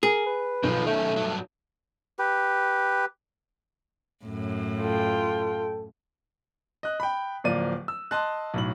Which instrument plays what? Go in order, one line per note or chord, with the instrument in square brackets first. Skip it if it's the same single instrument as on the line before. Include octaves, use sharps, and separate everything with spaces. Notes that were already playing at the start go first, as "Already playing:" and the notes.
[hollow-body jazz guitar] G#4 [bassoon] A#4
[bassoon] B4
[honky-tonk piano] B1 [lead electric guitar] D#3 F3
[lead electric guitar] D#3 C#4 [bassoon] A3
[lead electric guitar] G2 F#3
[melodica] G4 B4
[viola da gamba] F#2 A2
[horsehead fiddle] F4 G5 [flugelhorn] A4
[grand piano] D#5 F#6
G5 B5
D1 F3 A#3 D5 D#7
E6
D#5 A5 C6 F#6
B1 A2 F#7